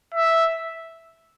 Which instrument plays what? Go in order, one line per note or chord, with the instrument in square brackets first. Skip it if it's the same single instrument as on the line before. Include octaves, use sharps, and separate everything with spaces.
[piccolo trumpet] E5